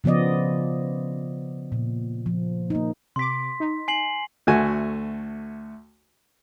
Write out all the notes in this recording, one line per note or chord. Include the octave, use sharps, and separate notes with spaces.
C#3 F3 B3 D5 D#5
A#2
F3
A#3 D#4
C3 C6 D6 B6
D#4
G#5 C7 F#7
D2 A3 F#4 G#5